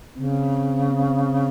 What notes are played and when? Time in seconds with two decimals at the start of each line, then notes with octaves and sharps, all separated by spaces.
0.17 C#3 C4
0.92 C4